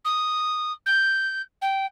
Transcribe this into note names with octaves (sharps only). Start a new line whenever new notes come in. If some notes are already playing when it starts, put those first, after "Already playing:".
D#6
G6
G5